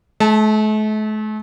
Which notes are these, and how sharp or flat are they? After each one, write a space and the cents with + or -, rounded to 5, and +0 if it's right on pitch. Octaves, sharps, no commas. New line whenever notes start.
A3 -40 A5 +0